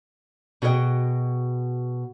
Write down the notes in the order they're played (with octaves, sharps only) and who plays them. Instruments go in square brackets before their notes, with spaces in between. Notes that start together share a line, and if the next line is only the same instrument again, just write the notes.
[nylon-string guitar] B2 F#4 G#4 A#4 D#5 G5